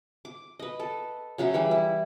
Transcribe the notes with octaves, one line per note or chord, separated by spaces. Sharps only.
D6
B4 D#5
A4
C#3 F#3 E5 F#5
E3 G3 B5
E4